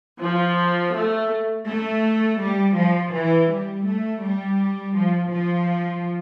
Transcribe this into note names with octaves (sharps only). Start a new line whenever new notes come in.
F3
A3
A3
G3
F3
E3
G3
A3
G3
F3
F3